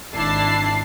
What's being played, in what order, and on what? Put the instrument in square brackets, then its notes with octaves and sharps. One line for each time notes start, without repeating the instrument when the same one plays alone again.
[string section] G#1 D4 E4 A5 C7